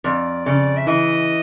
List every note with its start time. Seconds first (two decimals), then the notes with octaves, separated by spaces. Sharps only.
0.04 F2 D5
0.45 C#3 D5
0.77 E5
0.87 E3 D#5